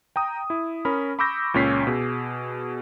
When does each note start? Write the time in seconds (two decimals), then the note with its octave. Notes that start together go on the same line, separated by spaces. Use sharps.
0.16 G5 A#5 D#6
0.50 E4
0.85 C#4 A#4 B5
1.19 B5 C#6 D6 E6 G6 A#6
1.54 C#2 A#2 C#4 B6 C7
1.87 B2 G#4